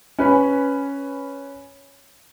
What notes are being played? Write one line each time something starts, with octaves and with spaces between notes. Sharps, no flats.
C#4 B4 G#5 B5